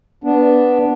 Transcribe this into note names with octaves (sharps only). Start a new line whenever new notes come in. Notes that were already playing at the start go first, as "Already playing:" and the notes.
B3 D4